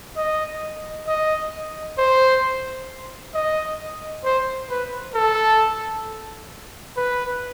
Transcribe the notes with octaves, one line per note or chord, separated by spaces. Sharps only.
D#5
D#5
C5
D#5
C5
B4
A4
B4